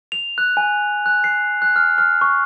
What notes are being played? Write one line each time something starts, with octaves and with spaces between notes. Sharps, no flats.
F7
F#6
G#5
F#6
C7
F#6
F6
F6
C#6